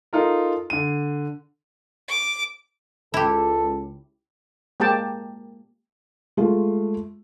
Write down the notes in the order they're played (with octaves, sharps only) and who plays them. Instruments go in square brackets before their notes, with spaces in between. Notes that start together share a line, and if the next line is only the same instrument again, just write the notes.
[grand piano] D#4 F4 A4 A#4
D3 D#7
[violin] D6
[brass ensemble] C#2 [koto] E4 G4 [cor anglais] A4
[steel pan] G#3 A#3 G4 G5 A5
[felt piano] G#3 A3 F4